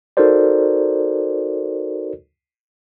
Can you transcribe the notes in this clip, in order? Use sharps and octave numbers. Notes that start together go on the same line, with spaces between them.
D#4 F#4 A4 A#4 C5 D5